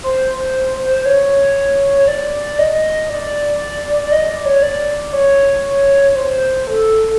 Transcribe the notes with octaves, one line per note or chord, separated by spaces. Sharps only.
C5
C#5
D5
D#5
D5
D#5
D5
C#5
D5
C#5
C5
A4